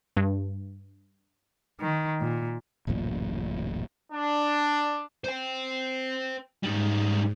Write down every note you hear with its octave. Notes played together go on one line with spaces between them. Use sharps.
G2
D#3
A#2
D1 A1 F#2 A#2
D4
C5 G5
G#2 G3 D#4